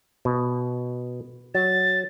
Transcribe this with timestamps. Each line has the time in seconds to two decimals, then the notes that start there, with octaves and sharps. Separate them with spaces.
0.25 B2
1.55 F#3 A6